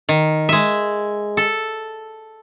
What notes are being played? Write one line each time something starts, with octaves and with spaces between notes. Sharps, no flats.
D#3
G#3 E5
A4